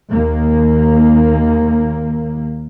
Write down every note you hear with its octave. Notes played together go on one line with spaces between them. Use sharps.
D#2 A#3